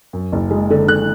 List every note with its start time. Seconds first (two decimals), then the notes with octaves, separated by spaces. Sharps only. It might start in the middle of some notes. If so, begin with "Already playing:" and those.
0.13 F#2
0.32 F#1
0.51 G#3
0.70 D3
0.88 D3 F#6